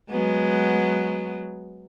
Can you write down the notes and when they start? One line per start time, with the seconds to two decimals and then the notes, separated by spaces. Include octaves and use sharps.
0.11 F#3 G#3 B3